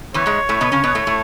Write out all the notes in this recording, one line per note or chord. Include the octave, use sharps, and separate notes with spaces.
E2 E3 C#5
G#2 G#3
A2 A3
B2 B3
C#3 C#4
B2 B3
A2 A3
A2 A3